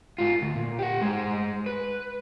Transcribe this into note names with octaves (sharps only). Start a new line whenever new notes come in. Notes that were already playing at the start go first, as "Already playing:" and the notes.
G#2 F4
D2
A#2
G4 F#5
G#3 C5
B4